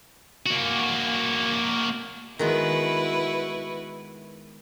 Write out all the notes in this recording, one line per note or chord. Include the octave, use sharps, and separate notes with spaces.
A#3 F#4
D#3 G#3 B3 E4 F#4 B4